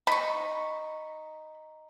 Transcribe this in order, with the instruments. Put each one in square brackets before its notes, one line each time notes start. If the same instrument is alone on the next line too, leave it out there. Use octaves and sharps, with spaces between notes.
[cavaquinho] D#4 C#6 [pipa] B5